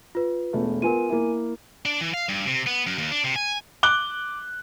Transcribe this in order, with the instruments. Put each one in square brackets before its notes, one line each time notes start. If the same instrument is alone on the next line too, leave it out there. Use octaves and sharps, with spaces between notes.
[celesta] F4 B4
[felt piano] E1 A3
[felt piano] B3 F4 [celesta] A#4 G#5 D#7
[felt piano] A#3 E4
[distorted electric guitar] D4
E3
F5
G2
C3
B3
F#2
D#2
D4
C3
G#5
[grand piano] D6 F#6 G7